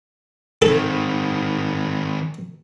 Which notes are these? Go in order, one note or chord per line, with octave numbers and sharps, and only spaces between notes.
D#3 C4 A4